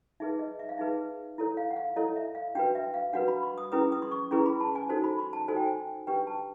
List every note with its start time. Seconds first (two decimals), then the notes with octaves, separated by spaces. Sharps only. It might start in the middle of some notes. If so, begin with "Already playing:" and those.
0.20 D#4 G#4 B4 E5
0.39 D#5
0.59 E5
0.69 F5
0.78 D#4 G#4 B4 E5
1.38 E4 A4 C#5
1.57 F5
1.71 F#5
1.76 F5
1.96 E4 A4 C#5 D#5
2.16 E5
2.35 F5
2.55 D4 F#4 B4 G5
2.75 E5
2.94 F5
3.13 D4 F#4 B4 F#5
3.28 B5
3.43 C6
3.58 D#6
3.72 C#4 E4 G#4 B4 D#6
3.92 D#6
4.02 C6
4.11 C#6
4.31 C#4 E4 G#4 B4 C6
4.46 B5
4.60 A5
4.75 G#5
4.89 D#4 F#4 A4 C5 A5
5.04 B5
5.19 C6
5.33 A5
5.48 D#4 F#4 A4 C5 G#5
5.57 G5
5.65 G#5
6.07 D4 G4 B4 G5
6.27 A5